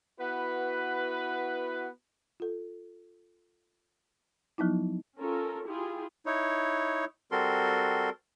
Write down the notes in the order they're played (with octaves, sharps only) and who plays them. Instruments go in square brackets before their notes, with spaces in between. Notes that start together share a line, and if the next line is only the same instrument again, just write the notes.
[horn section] B3 E4 F#4 B4
[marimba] F4 A4
F3 F#3 B3 D#4 E4
[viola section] C#4 F4 A4 A#4
E4 F4 G4 G#4
[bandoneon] D#4 E4 C#5
G3 C4 F#4 A4 A#4 C6